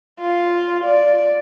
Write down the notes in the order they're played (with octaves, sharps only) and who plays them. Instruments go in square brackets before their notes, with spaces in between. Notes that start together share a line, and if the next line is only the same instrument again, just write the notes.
[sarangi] F4
D5